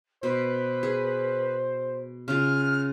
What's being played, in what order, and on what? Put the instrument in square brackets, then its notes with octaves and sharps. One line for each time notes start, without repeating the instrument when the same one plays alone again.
[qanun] B2 [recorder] B4 [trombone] C5
[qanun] G#4
[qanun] C#3 F4 [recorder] F6